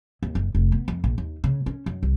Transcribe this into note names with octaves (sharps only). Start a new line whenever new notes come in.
D#2
F#1
F1
B3
F2
A#1
D#2
C#3
C#4
F#2
C2